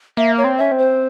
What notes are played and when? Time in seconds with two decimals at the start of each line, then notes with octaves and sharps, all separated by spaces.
0.17 A#3 E5
0.37 C#5
0.44 C4
0.57 C#4 E5
0.71 C4
0.78 C5